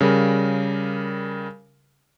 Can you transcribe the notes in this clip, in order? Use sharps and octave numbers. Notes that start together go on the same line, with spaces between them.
C#3 G3 A#4